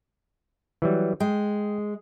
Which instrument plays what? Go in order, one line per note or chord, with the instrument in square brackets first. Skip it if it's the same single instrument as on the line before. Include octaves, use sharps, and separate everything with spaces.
[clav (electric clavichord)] E3 F#3 G3
[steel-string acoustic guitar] G#3 [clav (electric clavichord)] G5